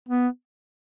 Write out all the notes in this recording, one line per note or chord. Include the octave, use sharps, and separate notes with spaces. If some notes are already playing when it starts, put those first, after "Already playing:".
B3